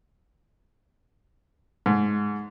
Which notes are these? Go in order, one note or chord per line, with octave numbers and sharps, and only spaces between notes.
G#2